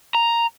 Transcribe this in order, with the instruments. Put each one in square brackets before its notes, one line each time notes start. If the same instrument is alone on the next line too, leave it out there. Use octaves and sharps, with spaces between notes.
[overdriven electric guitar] A#5